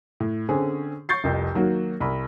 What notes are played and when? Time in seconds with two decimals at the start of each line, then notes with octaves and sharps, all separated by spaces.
0.20 A2
0.49 D3 C4 C#4 G#4
1.09 C#6 G6 A6 C7
1.24 F1 C2 F2
1.55 D#3 F#3 A#3 F#4
2.00 C2 B5